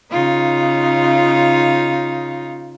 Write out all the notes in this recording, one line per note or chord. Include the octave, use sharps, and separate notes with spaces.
C#3 D#4 F4